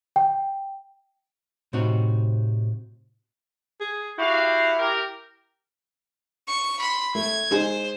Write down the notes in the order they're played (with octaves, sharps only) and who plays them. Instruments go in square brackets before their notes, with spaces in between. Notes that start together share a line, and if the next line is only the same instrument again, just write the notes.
[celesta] G5
[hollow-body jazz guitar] A2 C3 C4 D#4 F#4
[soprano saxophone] G#4
[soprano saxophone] E4 [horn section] F#4 G4 F5
[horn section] G4 A#4
[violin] C#6 C#7
B5 C6
[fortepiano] A3 [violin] G#6
[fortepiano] G#3 D#4 G#4 [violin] C5